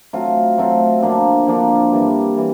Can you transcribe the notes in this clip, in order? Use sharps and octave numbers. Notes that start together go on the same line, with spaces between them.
F#3 A3 C4 F4
F#3 A3 C4 F4
D3 F3 A#3 D4
D3 F3 A#3 D4
G2 E3 G3 A#3
E3 G3